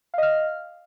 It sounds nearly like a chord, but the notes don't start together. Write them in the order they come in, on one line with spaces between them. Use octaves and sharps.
F5 D#5 F6